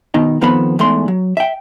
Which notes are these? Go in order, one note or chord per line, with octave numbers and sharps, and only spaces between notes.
B2 D#3 D#4
D#3 F3 B3 C4 A4 B5
E2 G#2 A3 C6
F#3
E5 G5